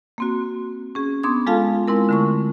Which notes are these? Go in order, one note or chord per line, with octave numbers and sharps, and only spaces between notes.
A#3 C4 F#4
C#4 G#4
B3 D4 C6 D#6 G#6
G#3 F4 A4 F5 A5
G#3 C4 E4 A#4
D3 A3 C#6